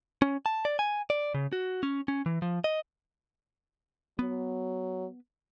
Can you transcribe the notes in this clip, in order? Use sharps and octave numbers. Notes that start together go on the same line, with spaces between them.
C#4
A5
D5
G#5
D5
C#3
F#4
C#4
C#4
E3
F3
D#5
F#3 B3